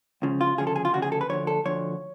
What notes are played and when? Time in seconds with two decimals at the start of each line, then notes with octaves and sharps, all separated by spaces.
0.22 C#2 C#3 F3
0.41 F4
0.58 D2 C#3 F3 G#4
0.67 A4
0.76 G#4
0.85 F4
0.93 D2 C#3 F3 F#4
1.02 G#4
1.12 A4
1.21 B4
1.29 D2 D3 F3 C#5
1.47 A4
1.65 D2 D3 F3 C#5